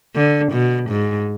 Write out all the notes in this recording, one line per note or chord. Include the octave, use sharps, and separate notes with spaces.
D3
B2
G#2